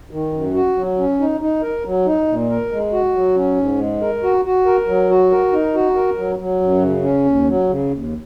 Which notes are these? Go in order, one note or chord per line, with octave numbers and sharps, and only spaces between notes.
D#3
F#2
F#4
F#3
C#4
D#4
D#4
A#4
F#3
D#4
A#2
A#4
G#3
F#4
F#3
C#4
G#2
G#3
A#4
F#4
F#4
A#4
F#3
F#4
A#4
D#4
F#4
A#4
F#3
F#3
F#2
C#3
C#4
D#2
F#3
C#3
D#2